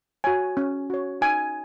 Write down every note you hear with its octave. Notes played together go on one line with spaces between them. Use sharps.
F#4 C#5 G#5
C#4
F#4 C#5
D#4 G#5